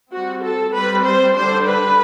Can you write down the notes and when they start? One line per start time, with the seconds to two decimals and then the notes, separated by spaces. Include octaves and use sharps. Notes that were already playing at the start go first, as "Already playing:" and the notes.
0.12 G3 C4 F#4
0.43 A4
0.73 G3 C4 B4
1.05 C5
1.35 D3 G3 D4 C5
1.66 B4